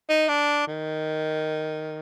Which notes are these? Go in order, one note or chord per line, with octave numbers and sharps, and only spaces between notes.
D#4
D4
D#3